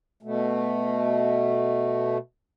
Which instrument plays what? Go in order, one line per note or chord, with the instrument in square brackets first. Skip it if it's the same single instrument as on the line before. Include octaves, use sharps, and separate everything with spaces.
[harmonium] B2 A3